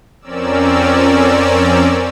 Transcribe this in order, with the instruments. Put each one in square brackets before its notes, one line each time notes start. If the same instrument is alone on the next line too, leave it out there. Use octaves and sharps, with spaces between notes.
[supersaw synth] F2 C4 C#4 A#4 D5 E6